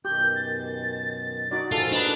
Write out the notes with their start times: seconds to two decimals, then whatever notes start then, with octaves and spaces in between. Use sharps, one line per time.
0.05 F#2 B2 D#3 G4 G6
0.36 A6
1.51 D#4 F#4 D5
1.72 F3 A#3 F4 G#4 A4
1.92 D4 D#4 B4 B5 F7